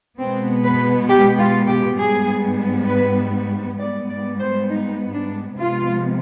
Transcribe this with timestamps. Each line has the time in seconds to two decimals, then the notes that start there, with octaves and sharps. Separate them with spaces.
0.18 B2 G#3 B3 C4
0.64 B4
1.09 G4
1.39 F4
1.68 G4
1.98 G#2 G3 B3 G#4
2.88 B4
3.79 G#2 G3 B3 D5
4.09 D5
4.39 C5
4.69 D#4
5.14 D4
5.59 C3 F3 G#3 B3 F4